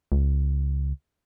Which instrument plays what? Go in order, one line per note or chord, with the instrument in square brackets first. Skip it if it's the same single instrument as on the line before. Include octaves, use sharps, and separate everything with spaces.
[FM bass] C#2